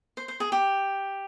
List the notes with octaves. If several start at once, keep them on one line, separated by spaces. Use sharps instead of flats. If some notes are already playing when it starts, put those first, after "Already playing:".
C5
C5
G#4
G4